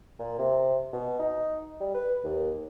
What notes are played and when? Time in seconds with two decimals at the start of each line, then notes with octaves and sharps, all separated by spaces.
0.19 A#2
0.38 C3
0.93 B2
1.19 D#4
1.80 G3
1.95 B4
2.25 D#2